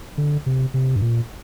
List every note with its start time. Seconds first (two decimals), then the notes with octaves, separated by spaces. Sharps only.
0.17 D3
0.46 C3
0.74 C3
0.96 G2
1.01 A#2